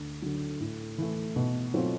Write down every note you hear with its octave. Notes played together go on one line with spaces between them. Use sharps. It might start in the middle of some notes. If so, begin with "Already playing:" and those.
Already playing: D2
D3 F#3
A2
E3 A3
B2
F#3 A3 C4 F4